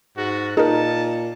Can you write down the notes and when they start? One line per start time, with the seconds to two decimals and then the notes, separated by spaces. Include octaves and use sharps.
0.17 G#2 F#4
0.57 A#2 D#4 G#4 A#4 A5